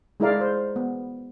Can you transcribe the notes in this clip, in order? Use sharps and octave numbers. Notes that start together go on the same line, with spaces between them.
G#3 D#4 E4 A#4 D5 F5
C5
B3